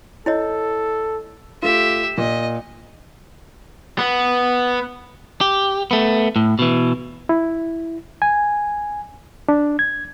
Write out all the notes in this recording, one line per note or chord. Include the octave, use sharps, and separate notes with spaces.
E4 A4 C#5 D#5
A3 F4 G4 E5
A#2 D#5
B3
G4
A3 B3
A2
B2 E3
E4
G#5
D4
G#6